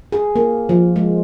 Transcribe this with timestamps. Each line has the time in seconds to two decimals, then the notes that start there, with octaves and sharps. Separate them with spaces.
0.12 G#4
0.36 A#3
0.69 F3
0.96 G#3